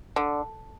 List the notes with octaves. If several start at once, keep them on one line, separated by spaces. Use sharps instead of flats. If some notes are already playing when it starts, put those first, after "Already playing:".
D3